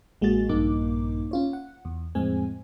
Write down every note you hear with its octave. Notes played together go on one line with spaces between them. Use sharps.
A1 G#3 A#3 F#4 G#4 A6
A#1 G2 A#3 D#4 D6
C#4 F4 C#5
F#5
E2
F2 A2 G#3 C4 G#5